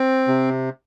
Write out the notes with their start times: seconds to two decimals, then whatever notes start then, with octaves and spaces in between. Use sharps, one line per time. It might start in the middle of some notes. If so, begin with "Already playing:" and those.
Already playing: C4
0.28 C3